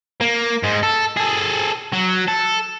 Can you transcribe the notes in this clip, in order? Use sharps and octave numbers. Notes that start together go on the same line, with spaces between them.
A#3
G#2 G#3
A4
G#4 A4
F#3
A4